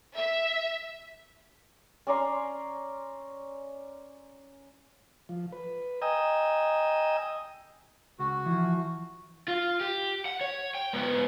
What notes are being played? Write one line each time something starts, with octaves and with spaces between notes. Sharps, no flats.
E5
C#4 D5 A#5 C6
F3
B4
D#5 G5 G#5 A#5 D#6 E6
C#2 F#4
E3 F3
F4
G4
F#5
C#5
G5
G#2 B3